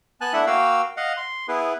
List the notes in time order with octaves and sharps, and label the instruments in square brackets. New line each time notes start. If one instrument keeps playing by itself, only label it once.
[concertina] B3 G#5 A5 F#6
A3 D4 E4 E5 F#5
A#3 F#4 F5 G5 E6
D#5 F5 F#5
C6
B3 E4 G#4 B4